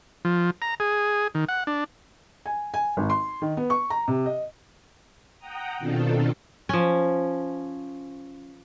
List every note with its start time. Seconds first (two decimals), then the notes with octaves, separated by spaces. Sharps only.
0.25 F3
0.62 A#5
0.80 G#4
1.35 D#3
1.49 F#5
1.67 D4
2.46 G#5
2.74 G#5
2.97 G#1
3.10 C6
3.42 D#3
3.57 B3
3.70 C#6
3.90 A#5
4.08 C3
4.26 D#5
5.39 F#5 G5 A#5 D#6
5.79 B2 D#3 C4 D4 F4 A4
6.69 F3 C#4